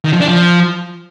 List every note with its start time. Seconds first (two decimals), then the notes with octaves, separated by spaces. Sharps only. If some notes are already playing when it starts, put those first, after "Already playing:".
0.05 D#3
0.13 F3
0.21 D4
0.28 F3